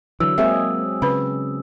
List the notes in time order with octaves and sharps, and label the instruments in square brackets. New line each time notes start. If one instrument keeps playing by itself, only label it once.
[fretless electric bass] D3 E3 [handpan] F#3 [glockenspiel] E6
[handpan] G#3 C4 G#4 [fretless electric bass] A#3 [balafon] E5
[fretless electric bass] C#3 [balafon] B4 B5